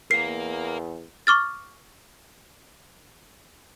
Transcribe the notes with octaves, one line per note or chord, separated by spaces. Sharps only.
E2 A#4 F5 C7
C#6 D6 F6 A6